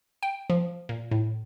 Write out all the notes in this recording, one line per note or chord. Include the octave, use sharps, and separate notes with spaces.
G5
F3
A#2
A2